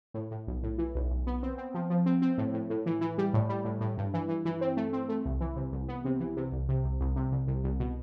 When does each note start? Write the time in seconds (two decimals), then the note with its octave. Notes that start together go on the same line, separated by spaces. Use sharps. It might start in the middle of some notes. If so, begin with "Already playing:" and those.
0.14 A2
0.31 A2
0.47 B1
0.63 A2
0.78 E3
0.95 B1
1.10 B1
1.27 B3
1.43 C4
1.58 C4
1.74 F3
1.90 F3
2.06 C4
2.22 C4
2.38 A2
2.54 A2
2.70 A2
2.86 E3
3.01 E3
3.18 G3
3.34 A2
3.49 G3
3.65 A2
3.81 A2
3.98 G2
4.14 E3
4.28 E3
4.45 E3
4.61 C4
4.77 A3
4.93 C4
5.09 A3
5.25 C2
5.41 E3
5.56 C3
5.72 C2
5.88 B3
6.05 C3
6.20 E3
6.37 C3
6.52 C2
6.68 C3
6.84 C2
7.00 C2
7.16 C3
7.32 C2
7.47 C2
7.64 C2
7.80 B2